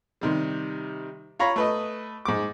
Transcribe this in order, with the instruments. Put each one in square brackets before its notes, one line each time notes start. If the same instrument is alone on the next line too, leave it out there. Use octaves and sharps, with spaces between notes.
[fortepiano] C3 D#3 G3
F4 C#5 A#5 B5
A3 B4 D#5
G#2 D6